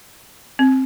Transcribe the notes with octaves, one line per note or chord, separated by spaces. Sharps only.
C4